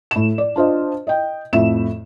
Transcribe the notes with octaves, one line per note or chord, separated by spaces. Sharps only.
A2 E7
D5
D4 F4 C5 D#5
D#5 G5
F2 A2 E5 E7